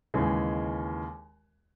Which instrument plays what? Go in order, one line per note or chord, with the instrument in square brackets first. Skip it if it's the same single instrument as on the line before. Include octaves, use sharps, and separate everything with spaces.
[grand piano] D#2 C#3 E3 G#3